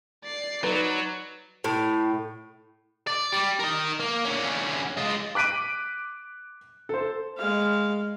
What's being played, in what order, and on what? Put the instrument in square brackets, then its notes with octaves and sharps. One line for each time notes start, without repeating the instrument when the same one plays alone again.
[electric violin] D5 C7
[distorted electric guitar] F#3 [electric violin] D#4 D5 [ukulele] B4
[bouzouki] A2
[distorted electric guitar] D5
G3
A#4 D#5
A#3
D3 C#4
G#3 F4
[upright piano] D6 F#6 B6 D7 D#7
A4 C5
[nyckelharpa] G#3 F5